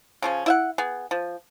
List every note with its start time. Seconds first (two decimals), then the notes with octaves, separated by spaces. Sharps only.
0.22 C#3 F3 C#4
0.46 E4 E5 F#5
0.78 B3 G#4
1.11 F3